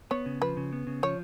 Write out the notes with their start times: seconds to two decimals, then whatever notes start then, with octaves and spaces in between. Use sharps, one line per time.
0.11 B3 C#5
0.26 C#3
0.42 F3 B4
0.57 C#3
0.72 B3
0.87 C#3
1.03 F3 C#5